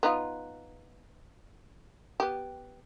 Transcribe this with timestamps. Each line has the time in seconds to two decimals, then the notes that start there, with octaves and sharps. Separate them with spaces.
0.03 B3 D#4 F4
2.20 B3 G4